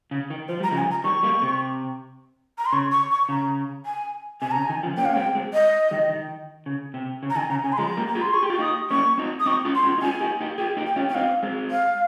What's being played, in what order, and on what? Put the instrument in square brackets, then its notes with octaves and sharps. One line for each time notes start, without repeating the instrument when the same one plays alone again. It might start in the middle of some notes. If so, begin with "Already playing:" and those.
[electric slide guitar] C#3
D#3
[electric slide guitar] F3 [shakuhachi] C5
[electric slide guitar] G3 [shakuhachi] A#5
[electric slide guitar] C#3 F3
[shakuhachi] G#5
A#5
[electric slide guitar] D#3 G3 [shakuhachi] C#6
[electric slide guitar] G3 A#3
C3
[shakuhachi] A#5
C6
[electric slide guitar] C#3 [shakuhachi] C#6
[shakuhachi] C#6
C#6
[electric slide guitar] C#3 [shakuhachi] A#5
[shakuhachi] G#5
[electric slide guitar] C3 [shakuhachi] G#5
[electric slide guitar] C#3 [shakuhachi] A#5
[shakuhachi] G#5
[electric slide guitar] D#3
C#3 F3
[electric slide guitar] A#3 C#4 [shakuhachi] G5
[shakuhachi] F5
[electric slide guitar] C#4
[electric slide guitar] G#3 C4 [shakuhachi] G5
[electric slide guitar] G#3 C4
[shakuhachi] D#5
[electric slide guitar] D#3 G3
D#3
C#3
C3
C#3
[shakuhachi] A#5
[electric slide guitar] D#3 [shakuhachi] G#5
[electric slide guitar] C#3 [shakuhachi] A#5
[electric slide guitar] C#3 [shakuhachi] G#5
[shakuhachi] C6
[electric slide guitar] F3 G#3 [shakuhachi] A#5
[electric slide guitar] G3 A#3
[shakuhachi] A#5
[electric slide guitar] F4 G#4
[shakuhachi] C6
[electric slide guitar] G#4 [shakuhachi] C#6
[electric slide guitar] G4
[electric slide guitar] F4 [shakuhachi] C#6
[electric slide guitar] D#4 G4 [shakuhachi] D#6
[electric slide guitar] A#3 C#4 [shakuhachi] C#6
[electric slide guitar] C4 D#4
[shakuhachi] D#6
[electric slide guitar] C4 D#4 [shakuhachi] C#6
[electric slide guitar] C#4 F4
[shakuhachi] C6
[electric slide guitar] C#4 F4
D#4
[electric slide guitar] C#4 F4 [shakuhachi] G#5
[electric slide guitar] D#4 G4
D#4 G4
[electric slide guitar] F4 G#4 [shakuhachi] G5
[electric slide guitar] D#4 G4
[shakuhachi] G5
[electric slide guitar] C#4 F4
[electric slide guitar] C#4 [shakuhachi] G5
[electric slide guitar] C4 D#4 [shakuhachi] F5
[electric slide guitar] G#3 C4
[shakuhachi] F5